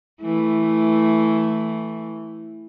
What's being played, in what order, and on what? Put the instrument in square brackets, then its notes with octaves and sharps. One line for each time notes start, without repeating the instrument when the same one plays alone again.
[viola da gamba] E3 A3